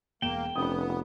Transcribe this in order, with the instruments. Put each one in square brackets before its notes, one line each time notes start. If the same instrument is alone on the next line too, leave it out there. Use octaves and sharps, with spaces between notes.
[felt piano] E1 D7 E7 [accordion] A#3 [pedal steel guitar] G5
[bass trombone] F1 [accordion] B3 [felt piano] C#4 F4 D#6